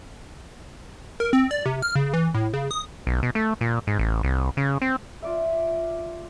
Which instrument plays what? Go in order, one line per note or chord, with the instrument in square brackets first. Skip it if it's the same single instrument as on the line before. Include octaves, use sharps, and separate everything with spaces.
[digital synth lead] A#4
C4
D5
C3
F6
C#3
E3
A2
C#3
D#6
[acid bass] B1
B2
A3
A#2
G#2
A1
C2
C#3
C4
[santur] F4 D5 E5